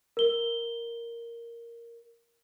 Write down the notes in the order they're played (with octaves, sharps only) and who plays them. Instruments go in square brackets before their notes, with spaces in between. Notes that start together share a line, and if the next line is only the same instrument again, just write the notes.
[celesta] A#4 G7